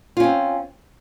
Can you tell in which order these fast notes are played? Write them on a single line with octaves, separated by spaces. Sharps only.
F4 C#4 C4